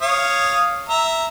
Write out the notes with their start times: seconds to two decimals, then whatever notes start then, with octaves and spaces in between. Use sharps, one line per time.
0.02 C#5 F5 D#6
0.89 E5 A#5